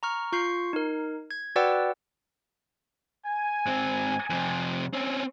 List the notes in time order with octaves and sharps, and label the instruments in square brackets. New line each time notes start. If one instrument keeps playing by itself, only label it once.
[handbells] A#5 C#6 F6
F4 C#6 G6 C7
D#4 A#4
G#6
F#4 B4 D5 F#5 G5 E6
[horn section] G#5
[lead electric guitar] G#2 C4
F2 C3
C4 C#4